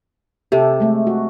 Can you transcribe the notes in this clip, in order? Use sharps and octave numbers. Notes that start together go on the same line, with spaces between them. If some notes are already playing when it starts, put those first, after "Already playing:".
C3 G4 A4
G#3 A3
F#4